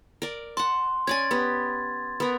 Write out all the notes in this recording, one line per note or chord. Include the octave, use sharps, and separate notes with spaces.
A#4 D5
F#5 A5 C6
C#4 D5 G#5 G#6 A6
B3 G4
B3 A#4